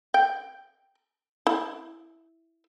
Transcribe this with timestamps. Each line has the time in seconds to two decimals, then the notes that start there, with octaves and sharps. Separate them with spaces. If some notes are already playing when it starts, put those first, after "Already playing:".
0.14 G5
1.47 E4